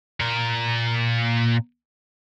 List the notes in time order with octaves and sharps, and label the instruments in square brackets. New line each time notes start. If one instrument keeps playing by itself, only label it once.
[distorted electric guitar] A#2 A#4